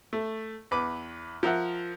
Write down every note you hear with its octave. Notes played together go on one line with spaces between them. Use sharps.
A3
E2 B4 D6
F3 A#4 E5 F#5